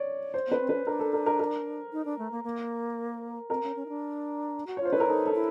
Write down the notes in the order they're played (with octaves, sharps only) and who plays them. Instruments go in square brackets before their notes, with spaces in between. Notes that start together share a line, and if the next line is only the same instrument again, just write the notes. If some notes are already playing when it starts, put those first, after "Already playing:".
Already playing: [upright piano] C#5 D5
C5
[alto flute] B3 [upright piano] B4
[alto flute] C4
[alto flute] C#4 [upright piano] B4
[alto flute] D4 [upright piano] A#4
[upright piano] A4
A#4
A#4
A#4
[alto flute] D#4
D4
A3
A#3
A#3
[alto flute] C4 [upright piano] A#4
[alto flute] C#4
C#4
D#4
D4
F#4
[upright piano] C#5
[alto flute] F4 [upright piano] C5
[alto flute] E4 [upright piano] B4
[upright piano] A#4
[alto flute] D#4 [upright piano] A4
[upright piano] A4
[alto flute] E4